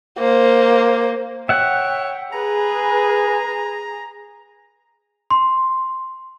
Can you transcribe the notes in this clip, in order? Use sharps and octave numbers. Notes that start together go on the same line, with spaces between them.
A#3 C5
C#5 E5 F#5 G5
G#4 B4 A#5
C6